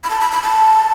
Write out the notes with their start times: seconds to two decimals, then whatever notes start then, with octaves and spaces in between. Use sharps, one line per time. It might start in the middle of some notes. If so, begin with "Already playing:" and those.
0.04 B5
0.10 A5
0.21 B5
0.32 B5
0.42 A5